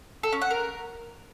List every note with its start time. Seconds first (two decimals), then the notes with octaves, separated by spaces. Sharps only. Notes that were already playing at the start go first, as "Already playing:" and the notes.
0.23 A4
0.32 C#4
0.42 F#5
0.51 A#4